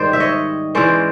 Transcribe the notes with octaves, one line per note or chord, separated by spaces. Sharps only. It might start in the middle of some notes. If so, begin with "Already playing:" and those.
Already playing: G#2 D#3 G3 C5 D5
E5
C#5 D#5
E3 G#3 C#4 C5 D5